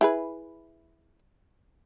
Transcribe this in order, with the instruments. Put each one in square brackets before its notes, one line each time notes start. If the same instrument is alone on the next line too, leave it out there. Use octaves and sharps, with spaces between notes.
[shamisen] E4 G#4 B4